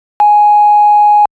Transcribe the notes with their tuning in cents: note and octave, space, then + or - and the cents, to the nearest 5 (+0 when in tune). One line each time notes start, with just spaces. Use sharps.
G#5 +5